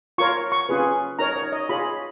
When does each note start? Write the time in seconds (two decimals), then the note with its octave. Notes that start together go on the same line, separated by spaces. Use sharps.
0.18 F4 A#4 C#5 C#6
0.52 C#6
0.69 C#4 F4 G#4 B4
1.19 D#4 A#4 C#5 A#5
1.36 C#5
1.52 D#5
1.69 F4 G#4 C#5 B5